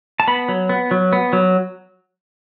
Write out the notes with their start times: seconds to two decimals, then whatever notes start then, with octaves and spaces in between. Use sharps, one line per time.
0.20 A5
0.28 B3 B5
0.48 F#3
0.69 B3
0.91 F#3
1.13 B3
1.33 F#3